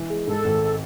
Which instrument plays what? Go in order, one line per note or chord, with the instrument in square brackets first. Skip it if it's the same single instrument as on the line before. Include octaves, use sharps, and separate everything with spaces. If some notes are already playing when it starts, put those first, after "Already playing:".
Already playing: [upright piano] E3
G#3
[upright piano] G#2 [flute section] A4
[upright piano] G#1